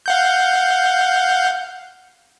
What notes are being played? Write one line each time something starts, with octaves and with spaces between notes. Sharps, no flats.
F5 F#5 G6